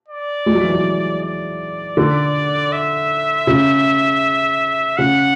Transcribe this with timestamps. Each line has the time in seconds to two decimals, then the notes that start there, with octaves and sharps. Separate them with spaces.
0.08 D5
0.46 G#3
0.55 F#3
0.63 E3
0.73 F#3
1.22 D5
1.97 D3
2.72 E5
3.47 C#3
4.98 C#3 F#5